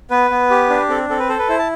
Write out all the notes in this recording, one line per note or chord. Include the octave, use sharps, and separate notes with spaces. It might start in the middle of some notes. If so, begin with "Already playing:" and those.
B3 B4
B3
G4
D4
C4 A4
C4 A4
B4
A4 C5
B4
E4 C5
A5